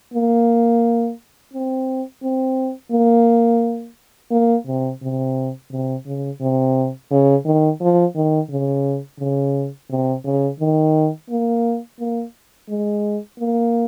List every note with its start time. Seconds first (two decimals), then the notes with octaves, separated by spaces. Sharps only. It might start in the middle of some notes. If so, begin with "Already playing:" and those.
0.14 A#3
1.53 C4
2.23 C4
2.92 A#3
4.31 A#3
4.66 C3
5.02 C3
5.71 C3
6.06 C#3
6.41 C3
7.11 C#3
7.45 D#3
7.80 F3
8.15 D#3
8.49 C#3
9.19 C#3
9.90 C3
10.24 C#3
10.60 D#3
11.30 A#3
11.99 A#3
12.69 G#3
13.39 A#3